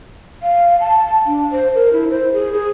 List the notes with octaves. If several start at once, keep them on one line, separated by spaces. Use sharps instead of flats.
F5
A5
D4
C5
A#4
E4
C5
G#4
G#4